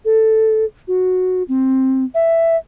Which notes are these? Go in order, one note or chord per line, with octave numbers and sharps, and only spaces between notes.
A4
F#4
C4
E5